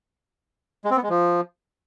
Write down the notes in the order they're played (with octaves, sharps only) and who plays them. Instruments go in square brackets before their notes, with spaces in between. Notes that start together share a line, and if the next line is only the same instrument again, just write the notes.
[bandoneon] G#3
C4
B3
G#3
F3